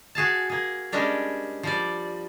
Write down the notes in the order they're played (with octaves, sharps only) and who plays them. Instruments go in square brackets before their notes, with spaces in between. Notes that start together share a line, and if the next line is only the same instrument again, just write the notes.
[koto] F#4 G#4 F5 A5
A#3 G#4
G3 G#3 C#4 D4 A#4
F3 G3 D5